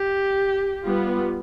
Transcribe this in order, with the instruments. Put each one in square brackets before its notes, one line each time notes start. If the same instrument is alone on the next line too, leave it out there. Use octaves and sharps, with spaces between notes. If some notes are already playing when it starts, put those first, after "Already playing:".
Already playing: [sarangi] G4
[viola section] G3 B3 F4